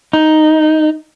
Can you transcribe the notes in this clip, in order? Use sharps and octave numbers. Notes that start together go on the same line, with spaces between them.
D#4